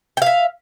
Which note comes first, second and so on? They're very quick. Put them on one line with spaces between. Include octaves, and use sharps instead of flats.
G5 F5 E5